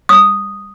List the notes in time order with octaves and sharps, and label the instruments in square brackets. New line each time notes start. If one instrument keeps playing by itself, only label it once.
[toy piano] D#6